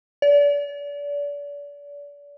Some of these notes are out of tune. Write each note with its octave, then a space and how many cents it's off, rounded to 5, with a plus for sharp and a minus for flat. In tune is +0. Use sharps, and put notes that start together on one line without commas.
D5 -35